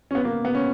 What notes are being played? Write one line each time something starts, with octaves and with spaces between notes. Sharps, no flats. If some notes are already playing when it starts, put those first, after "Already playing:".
C#4
B3
A#3
B3
C#4